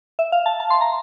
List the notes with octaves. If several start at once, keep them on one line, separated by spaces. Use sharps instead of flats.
E5
F5
A5
A5
C6
A#5